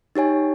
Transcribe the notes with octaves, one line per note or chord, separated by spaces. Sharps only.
D#4 G4 C#5 G#5